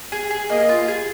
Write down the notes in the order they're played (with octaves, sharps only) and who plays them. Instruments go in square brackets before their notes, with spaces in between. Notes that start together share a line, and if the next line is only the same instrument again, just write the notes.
[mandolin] G#4
G#4
[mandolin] A#3 [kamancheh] D#5
[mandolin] F4
G#4